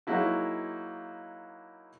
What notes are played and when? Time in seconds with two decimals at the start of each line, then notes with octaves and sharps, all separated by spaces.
0.07 F#3 G#3 A#3 D#4 E4 F#4